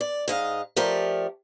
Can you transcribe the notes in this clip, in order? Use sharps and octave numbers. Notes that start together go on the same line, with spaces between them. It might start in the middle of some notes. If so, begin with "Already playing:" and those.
D5
G#2 D#5 F5
F3 A3 G4 A#4 D5